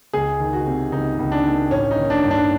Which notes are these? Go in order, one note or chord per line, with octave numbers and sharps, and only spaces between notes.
C#2 G#4
D#3
F#4
C3
C#2 D#4
C#2
D4
D#3
A1 C#4
D#4
D#3
D4
G2
D4